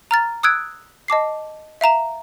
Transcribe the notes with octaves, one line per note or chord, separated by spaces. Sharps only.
A#5 F6 A6
D#6 E6 F#6 G#6 D7
D#5 A5 D6 C7
E5 F5 A#5 E7